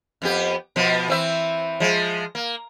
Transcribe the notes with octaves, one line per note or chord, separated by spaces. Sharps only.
F2 B3 G4
B2 F3 B3
E3 C4 E5
F3 G#3
A#3